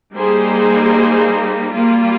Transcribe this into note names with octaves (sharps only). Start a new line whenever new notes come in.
G3 A#3 D#4 G#4 C5
G3 A#3 F4